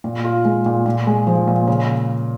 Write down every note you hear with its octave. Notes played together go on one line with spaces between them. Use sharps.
A#2
F4
G#3
A#2
A#2
G#3
F3
A#2
C#3